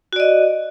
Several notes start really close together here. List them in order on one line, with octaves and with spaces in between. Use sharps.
F#4 D5 D#5